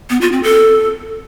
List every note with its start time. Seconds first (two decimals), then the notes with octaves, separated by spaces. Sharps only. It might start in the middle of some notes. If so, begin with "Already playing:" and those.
0.10 B3
0.21 F4
0.32 C4
0.43 A4